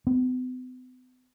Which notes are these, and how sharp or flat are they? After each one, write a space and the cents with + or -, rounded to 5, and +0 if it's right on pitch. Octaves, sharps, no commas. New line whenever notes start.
B3 +45